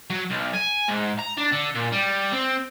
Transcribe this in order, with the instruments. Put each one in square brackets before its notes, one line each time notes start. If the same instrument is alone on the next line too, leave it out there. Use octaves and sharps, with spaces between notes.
[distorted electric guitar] F#3
B1
G#5
G#2
A#5
D4
D3
A#2
G3
C4